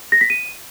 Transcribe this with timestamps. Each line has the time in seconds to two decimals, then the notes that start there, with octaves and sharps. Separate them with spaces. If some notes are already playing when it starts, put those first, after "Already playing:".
0.12 A#6
0.21 B6
0.30 D#7